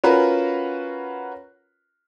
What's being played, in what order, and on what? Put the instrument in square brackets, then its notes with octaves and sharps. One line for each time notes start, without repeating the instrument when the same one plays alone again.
[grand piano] C#4 F4 F#4 A#4 B4